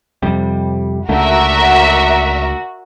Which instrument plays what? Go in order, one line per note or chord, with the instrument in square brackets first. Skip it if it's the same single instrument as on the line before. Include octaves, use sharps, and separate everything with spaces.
[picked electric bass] F2 C3 G3
[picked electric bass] C#2 D3 A3 [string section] F#4 [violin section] A#4 D5 E5